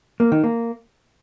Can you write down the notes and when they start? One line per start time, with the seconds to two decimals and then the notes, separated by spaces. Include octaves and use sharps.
0.20 A#3
0.32 D#3
0.44 A#3